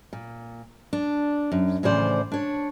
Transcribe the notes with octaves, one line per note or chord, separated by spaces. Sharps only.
A#2
D4
F#2
A2 C#3 E3 F3 C5 D5
D4 C#5